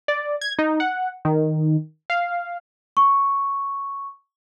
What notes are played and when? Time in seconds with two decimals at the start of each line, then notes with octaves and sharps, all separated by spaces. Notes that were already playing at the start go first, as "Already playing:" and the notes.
0.08 D5
0.41 G#6
0.59 D#4
0.80 F#5
1.25 D#3
2.10 F5
2.97 C#6